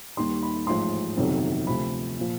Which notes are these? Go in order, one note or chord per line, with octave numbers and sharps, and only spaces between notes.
D#2 D#3 G3 C6
B5
A1 G#2 F3 C6
G1 F2 C3 D#3 F#3
D2 C3 F3 B5
A#2 F3